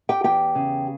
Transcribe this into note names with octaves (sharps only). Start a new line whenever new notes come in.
G4 G5
E2 G4 G5
C#3